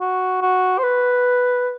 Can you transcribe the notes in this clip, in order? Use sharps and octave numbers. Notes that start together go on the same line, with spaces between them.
F#4
F#4
C5
B4